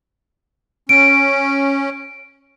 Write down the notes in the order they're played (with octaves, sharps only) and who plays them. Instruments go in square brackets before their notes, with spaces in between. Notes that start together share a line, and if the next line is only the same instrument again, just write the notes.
[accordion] C#4 [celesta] D7